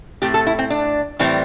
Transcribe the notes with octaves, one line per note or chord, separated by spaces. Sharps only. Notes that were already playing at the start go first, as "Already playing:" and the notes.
A2 A3 C4 G4
A4
E4
C4
D4
A2 E3 G3 C4